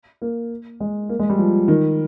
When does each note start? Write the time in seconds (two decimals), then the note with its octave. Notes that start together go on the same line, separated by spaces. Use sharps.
0.22 A#3
0.80 G#3
1.09 A#3
1.19 G#3
1.30 G3
1.38 F3
1.68 D#3